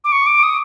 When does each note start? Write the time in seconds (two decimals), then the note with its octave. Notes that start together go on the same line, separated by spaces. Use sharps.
0.04 D6
0.12 C#6
0.27 D6
0.43 D#6